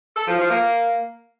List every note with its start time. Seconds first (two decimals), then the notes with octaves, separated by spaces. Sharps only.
0.16 A4
0.28 F3
0.39 F3
0.50 A#3